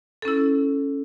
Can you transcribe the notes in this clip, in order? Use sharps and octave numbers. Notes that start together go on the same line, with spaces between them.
C#4 E4 A4